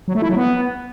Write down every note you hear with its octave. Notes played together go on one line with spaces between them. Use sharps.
F#3
A3
E4
F#3
B3